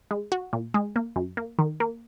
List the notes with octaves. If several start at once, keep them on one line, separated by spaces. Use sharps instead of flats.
G#3
F#4
A#2
G#3
A#3
F#2
A#3
D#3
A#3